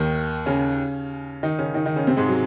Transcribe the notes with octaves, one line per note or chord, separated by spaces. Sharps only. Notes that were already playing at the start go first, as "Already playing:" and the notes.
Already playing: D#2 D#3
C#3 C#4
D#3 D#4
C#3 C#4
D#3 D#4
D#3 D#4
C#3 C#4
C3 C4
G#2 G#3
F#3